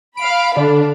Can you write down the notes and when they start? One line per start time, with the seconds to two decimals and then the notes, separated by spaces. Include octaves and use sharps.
0.17 F5 B5 D7
0.57 D3 D4